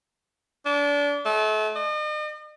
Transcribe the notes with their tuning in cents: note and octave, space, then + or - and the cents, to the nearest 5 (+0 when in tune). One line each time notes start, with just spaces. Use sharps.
D4 -30
A3 -35
D#5 -45